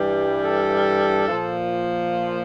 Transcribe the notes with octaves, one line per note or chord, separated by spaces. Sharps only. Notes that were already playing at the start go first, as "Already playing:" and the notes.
Already playing: G2 E3 G3
A4
A#2 F3